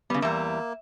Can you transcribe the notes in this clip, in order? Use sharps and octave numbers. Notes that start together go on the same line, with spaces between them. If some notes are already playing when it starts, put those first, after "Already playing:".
C#3 G3 B3
E2 G3 A#3 E5